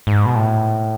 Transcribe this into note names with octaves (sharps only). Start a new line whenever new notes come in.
G#2
B2
A2